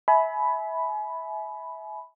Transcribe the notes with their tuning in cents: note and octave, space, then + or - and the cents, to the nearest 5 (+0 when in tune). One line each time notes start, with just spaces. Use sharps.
E5 -20 G#5 +35 B5 +0